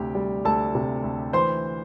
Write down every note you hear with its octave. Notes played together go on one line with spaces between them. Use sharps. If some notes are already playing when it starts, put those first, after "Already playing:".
Already playing: D2 C3 G4
G3
D2 A4 A5
C3
D2
E3 C5 C6